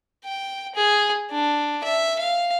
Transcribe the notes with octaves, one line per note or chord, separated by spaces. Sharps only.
G5
G#4
D4
E5
F5